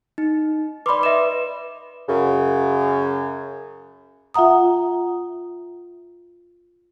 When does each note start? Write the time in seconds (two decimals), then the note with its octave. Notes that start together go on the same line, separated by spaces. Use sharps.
0.18 D#4
0.86 B4 D5 B5 C6 D6
1.03 B4 D#5 E5 E7
2.09 F#2 C#3
4.34 F4 E5 F#5 A#5 D#6